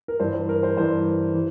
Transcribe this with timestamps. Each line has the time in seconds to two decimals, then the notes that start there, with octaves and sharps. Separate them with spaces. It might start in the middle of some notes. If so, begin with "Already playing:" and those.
0.08 A#4
0.20 G2 E3 C5
0.34 C5
0.49 A#4
0.63 C5
0.77 G2 E3 C5
1.34 E3